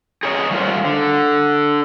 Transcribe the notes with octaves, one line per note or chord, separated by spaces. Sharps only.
G#4 A#4 C#5 D#5
F#3 G3 F4 A#4 C5
D3